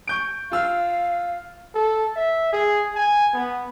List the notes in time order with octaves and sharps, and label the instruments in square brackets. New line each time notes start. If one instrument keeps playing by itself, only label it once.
[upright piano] C#6 G6 D7
[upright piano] F4 E6 F6 [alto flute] F5
[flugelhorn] A4
E5
G#4
G#5
B3